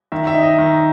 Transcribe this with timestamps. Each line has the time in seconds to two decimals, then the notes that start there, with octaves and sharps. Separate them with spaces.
0.12 D#3 E5
0.27 E5
0.34 D#4
0.43 D#5
0.58 D#3